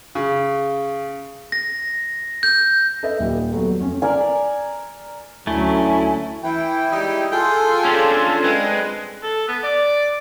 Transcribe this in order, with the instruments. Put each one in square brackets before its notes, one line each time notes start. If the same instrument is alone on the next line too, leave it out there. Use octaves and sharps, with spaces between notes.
[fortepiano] C#3
[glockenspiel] A#6
G6
[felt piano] A4 B4 D#5 E5
D#1 G3
F#3 G3 A3 B3
F2 C#4
[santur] A#4 D5 G#5
[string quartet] D2 F#3 C#4 [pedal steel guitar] A3 [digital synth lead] E4 [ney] G#5
[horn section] E3 [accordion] E4 G5
[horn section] G3 G#3 D#4
[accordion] F4 A4 [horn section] G#4 G5
[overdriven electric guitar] C#4 D4
[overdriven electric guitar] G#3 [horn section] C4 D4 B4
[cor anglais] A4
B3
D5